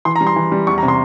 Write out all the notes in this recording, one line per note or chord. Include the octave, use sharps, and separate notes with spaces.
E3 C6
A#5
G3
C6
E3
G3
E2 C#6
A#5
C3
C6